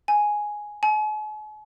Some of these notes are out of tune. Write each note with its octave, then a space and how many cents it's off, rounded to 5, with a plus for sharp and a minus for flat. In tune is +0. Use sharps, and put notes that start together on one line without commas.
G#5 +5
G#5 +45